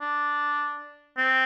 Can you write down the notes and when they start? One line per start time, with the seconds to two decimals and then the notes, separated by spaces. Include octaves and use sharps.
0.01 D4
1.18 C4